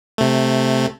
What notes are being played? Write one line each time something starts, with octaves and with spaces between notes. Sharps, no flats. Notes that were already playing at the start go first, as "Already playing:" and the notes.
C3 A3